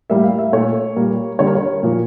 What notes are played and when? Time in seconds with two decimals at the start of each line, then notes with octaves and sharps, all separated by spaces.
0.10 A2 G3 A#3 E5
0.24 F5
0.39 E5
0.52 A#2 A3 C#5
0.96 A#2 G3 A#3
1.39 D3 G3 A#3 C#5
1.47 A#4
1.55 C#5
1.83 A#2 F3 A#3